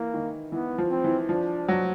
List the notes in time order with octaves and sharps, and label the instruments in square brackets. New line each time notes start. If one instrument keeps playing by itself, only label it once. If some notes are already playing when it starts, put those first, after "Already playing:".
Already playing: [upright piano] E3 [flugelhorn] A#3
[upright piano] D#3
[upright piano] E3 [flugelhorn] B3
[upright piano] F3
[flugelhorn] C4
[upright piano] E3
[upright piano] F3 [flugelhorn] D4
[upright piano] F#3